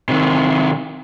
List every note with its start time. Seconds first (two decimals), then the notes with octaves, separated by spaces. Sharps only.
0.09 C3 D#3